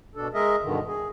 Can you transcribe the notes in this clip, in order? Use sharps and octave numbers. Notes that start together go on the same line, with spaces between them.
B2 D4 A4
G#3 G#4 A#4 D#5 E5
G2 B2 D3 D#3
G#4